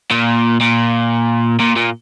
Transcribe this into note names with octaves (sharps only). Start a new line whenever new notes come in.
A#2
A#2
A#2
A#2